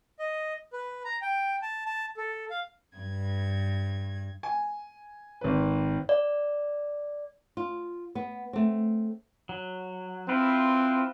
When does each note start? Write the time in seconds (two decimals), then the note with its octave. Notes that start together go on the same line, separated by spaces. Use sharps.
0.19 D#5
0.73 B4
1.05 A#5
1.22 G5
1.62 A5
1.85 A5
2.17 A4
2.51 F5
2.97 G2 G#6
4.43 G#5
5.41 G#1 B4
6.09 D5
7.57 F4
8.15 B3
8.53 A3 C4
9.49 F#3
10.29 C4 E4 F4 B4